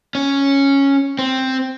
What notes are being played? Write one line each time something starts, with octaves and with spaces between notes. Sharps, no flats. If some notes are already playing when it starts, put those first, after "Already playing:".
C#4
C4